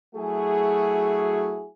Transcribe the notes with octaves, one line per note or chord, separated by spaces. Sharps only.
F#3 A3 E4 F#4 G#4